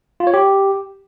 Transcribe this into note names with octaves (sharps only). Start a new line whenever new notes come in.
F4
C#5
G4